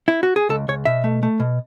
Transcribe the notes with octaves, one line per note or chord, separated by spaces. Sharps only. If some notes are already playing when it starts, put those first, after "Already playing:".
E4
F#4
G#4
C#2 A4
C#2 C#5
B2 E5
A3
A3
B2